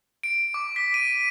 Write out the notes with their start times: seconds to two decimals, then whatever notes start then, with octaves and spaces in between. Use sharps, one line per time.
0.23 D7
0.54 D6
0.76 B6
0.94 D#7